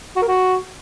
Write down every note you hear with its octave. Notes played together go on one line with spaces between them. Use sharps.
F#4
A#4
F#4